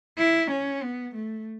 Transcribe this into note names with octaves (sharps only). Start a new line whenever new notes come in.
E4
C#4
B3
A3